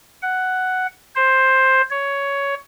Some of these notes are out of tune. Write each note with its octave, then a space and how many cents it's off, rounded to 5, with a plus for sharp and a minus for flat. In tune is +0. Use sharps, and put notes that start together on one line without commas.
F#5 +5
C5 +10
C#5 +10